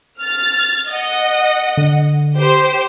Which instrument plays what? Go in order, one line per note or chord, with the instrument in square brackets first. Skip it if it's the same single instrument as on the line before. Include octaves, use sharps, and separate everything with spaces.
[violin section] F6 A6
D#5 F#5
[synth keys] D3
[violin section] G4 C5